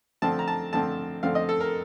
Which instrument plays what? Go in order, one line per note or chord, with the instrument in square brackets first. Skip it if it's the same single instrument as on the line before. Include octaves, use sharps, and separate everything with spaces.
[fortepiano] D3 F3 A3 C4 A5
A#5
A5
D3 F3 A3 C4 A5
D3 F3 A3 C4 F5
D#5
A4
A#4